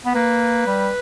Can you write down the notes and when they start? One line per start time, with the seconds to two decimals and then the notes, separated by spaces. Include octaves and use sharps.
0.06 B3
0.15 A#3 B4
0.67 G3